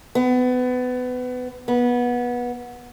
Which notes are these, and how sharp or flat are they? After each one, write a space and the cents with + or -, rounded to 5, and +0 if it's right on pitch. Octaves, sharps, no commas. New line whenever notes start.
B3 +25
B3 -20